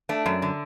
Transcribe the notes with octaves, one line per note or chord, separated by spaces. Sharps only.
A3 D4
F#2
D3